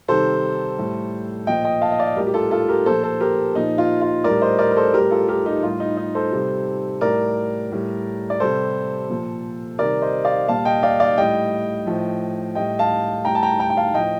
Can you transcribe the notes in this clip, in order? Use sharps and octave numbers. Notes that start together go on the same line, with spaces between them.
C3 D#3 G3 A4 C5
A2 G3
A#2 F3 D#5 G5
D#5 G5
F5 A5
D#5
D5 F5
A2 G3 G4 A#4
G4
F4 A4
F4 A4
G4 A#4
A#2 F3 A4 C5
A4 C5
G4 A#4
A#2 F3 D#4
F4
F4
A2 G3 A#4 D5
C5 D#5
A#4 D5
A#4
A4 C5
A2 G3 G4 A#4
F4 A4
G4 A#4
D#4 G4
A2 G3 F4
D#4
D#4
A4 C5
C3 G3
A2 G3 A#4 D5
A2 G3
D5
C3 G3 A4 C5
A#2 F3
C3 D#3 G3 A#4 D5
C5 D#5
D5 F5
A#2 G3 F5 A5
D#5 G5
D5 F5
D5 F5
A2 G3 D#5 G5
A2 F3
A2 G3 D#5 G5
F5 A5
A2 G3 G5 A#5
A5
G5 A#5
G5 A#5
G5
F5 A5
A2 F3 D#5 G5